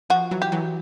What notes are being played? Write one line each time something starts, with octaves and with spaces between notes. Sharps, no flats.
F3 F#4
E3 F#3
G4
E3 F#3